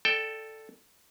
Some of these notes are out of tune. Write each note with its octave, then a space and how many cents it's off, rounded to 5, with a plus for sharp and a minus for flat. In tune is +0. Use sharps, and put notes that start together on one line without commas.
A4 +0 D5 +25 G5 +0